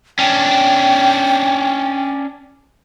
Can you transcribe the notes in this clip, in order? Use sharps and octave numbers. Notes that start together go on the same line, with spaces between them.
C#4 D4 G5